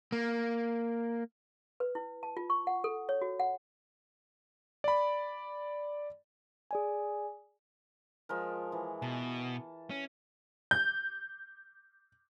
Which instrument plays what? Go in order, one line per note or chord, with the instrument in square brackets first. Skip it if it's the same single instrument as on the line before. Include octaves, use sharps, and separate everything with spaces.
[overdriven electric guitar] A#3
[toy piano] B4
E4
A5
F4
C#6
F#5
A4
C#5
F#4
F#5
[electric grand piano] D5 B5
[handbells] G#4 D5 G#5
[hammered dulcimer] F3 G#3 A#4
E3
[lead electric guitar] B2 [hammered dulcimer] A5
[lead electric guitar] C#4
[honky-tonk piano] G6